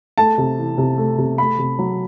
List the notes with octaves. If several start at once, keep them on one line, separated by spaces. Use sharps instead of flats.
A3 A5
C3
E3
C3
A3
C3
A3 B5
C3
F#3